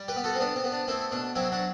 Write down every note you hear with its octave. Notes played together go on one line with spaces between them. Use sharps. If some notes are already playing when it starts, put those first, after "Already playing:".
Already playing: G3
G4 B4
B3
F#4 A4
C4
B3 D4
C4
B3
D4
A3 C4 E4
B2 D4
F#3 C4 E4
D4 F#4